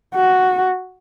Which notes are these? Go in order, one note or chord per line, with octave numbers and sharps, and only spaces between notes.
F#4